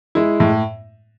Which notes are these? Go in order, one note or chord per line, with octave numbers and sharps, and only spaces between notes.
G#3 E4
A2